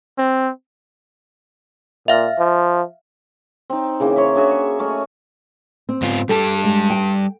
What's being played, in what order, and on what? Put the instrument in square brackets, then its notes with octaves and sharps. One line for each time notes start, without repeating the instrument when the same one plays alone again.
[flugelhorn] C4
[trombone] A#2 [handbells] E5 F5 F6
[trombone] F3
[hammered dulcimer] C4 D#4
C#3 E3 A#3
C5 C#5 D#5 E5
D4 F#4 G#4 E5
C#6
A3 C#4 D#5
[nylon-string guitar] C4
[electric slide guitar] G#2 B3 F4
[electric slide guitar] G3 G4 A5 [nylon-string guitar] A4
[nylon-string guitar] G#3
G5